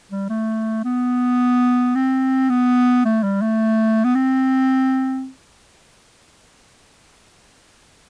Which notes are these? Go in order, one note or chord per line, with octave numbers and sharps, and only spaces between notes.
G3
A3
B3
C4
B3
A3
G3
A3
B3
C4